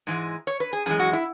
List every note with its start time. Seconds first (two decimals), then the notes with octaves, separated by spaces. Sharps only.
0.07 G#2 E3 G#3
0.47 C#5
0.60 B4
0.73 G#4
0.86 F#2 E3 G#3 G#4
1.00 F#4
1.13 E4